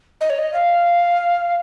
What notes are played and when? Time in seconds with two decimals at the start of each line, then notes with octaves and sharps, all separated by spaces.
0.21 D#5
0.30 C#5
0.39 D#5
0.54 F5